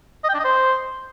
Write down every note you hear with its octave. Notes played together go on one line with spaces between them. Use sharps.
D#5
G5
D4
D#5
C5